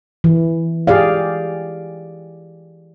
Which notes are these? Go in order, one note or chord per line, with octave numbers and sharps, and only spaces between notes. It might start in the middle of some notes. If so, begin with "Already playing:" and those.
E3
G4 G#4 D5 F5